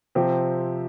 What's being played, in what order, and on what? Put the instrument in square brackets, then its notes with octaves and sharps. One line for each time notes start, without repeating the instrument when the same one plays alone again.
[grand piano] C3 F3 C4 G4